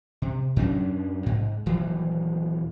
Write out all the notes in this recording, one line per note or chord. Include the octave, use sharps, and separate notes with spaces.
C3
F#2 F#3 C#4 D4
G#2
D#1 E3 F#3